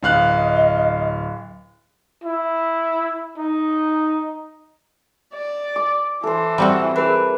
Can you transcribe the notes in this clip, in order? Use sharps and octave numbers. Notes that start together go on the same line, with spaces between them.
D1 D#5 F5 F#6
E4
D#4
D5
D6
E3 A4 C5
G3 C4 F#4
G#4 A#4 B4